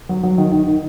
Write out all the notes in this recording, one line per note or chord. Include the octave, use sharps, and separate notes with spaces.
F#3
F#3
D#3
D#3
D#3